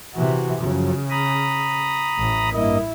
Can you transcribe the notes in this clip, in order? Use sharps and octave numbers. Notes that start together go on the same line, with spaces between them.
C3 E3 F#4
F#2 C#3 F3 F#3
A#5 B5 D#6
A1 A2
G2 A#3 E4 D#5